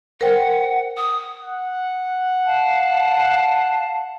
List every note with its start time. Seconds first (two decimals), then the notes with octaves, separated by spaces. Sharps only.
0.21 A#4 C5 F#5 G5
0.97 D#6
1.40 F#5
2.45 F5 A5